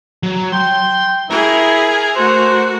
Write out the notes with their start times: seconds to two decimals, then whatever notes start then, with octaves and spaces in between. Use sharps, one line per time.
0.23 F#3
0.53 G5 C6
1.30 E4 G#4 A#4
2.16 A3 F#4 C5